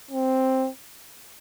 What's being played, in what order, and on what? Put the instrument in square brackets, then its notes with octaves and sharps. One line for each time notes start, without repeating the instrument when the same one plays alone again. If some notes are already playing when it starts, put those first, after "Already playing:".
[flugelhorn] C4